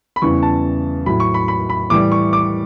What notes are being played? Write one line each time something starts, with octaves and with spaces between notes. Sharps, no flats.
B5
E2 C#3 E3 G3 C#6
A5
A2 F#3 B5
C#6
B5
B5
B5
A2 E3 G3 D6
C#6
D6